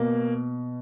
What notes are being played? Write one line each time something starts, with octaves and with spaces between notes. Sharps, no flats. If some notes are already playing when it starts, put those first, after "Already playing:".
Already playing: B2 A#3